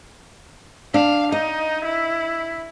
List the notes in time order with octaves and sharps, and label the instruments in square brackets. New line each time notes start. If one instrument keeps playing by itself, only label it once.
[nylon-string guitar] D4 [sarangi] F5
[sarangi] D#4 [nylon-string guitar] D#5
[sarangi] E4